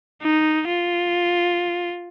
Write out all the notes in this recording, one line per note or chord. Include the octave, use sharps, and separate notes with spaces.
D#4
F4